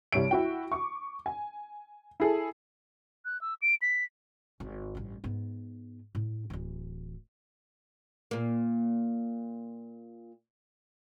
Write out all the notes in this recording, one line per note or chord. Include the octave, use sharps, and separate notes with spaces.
C2 G3 C#5 D7
E4 F#4 G5
C#6 D6
G#5
E4 G#4 A4
F#6
E6
D7
B6
G#1
A1 G2
G#2 B3
A2
D1 E3
A#2 A#3